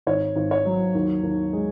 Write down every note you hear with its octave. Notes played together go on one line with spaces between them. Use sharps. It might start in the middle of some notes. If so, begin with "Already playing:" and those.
G#1 C#5
G#1
C#5
F#3
D#2
D#2
G#3